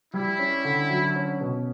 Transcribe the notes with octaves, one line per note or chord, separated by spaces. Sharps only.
G3 E4
C#4
D3
F#3
C#4
B2